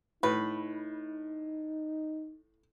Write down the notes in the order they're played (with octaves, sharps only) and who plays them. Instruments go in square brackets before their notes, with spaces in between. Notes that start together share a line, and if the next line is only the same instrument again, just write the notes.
[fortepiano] A2 [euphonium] D#4 [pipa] B4